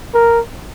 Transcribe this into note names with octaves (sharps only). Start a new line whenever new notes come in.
A#4